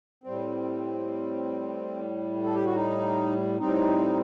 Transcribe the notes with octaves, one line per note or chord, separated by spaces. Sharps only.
A2 G3 C4
A4
G4
F#4
D#4
A2 G3 C4 D#4